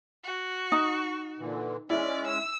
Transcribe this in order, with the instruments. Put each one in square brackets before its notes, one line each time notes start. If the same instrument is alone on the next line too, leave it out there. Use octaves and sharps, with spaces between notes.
[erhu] F#4
[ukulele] D#4 [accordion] C#6
[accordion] A#2 D3 E3
[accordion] G#3 C#4 [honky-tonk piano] E4 [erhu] D5
[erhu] E6